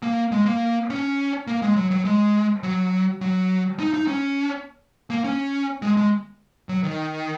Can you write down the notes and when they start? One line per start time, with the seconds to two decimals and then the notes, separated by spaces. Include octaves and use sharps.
0.02 A#3
0.32 G#3
0.46 A#3
0.90 C#4
1.47 A#3
1.62 G#3
1.76 F#3
1.91 F#3
2.05 G#3
2.63 F#3
3.21 F#3
3.79 D#4
3.94 D#4
4.08 C#4
5.10 A#3
5.24 C#4
5.82 G#3
5.97 G#3
6.69 F#3
6.83 D#3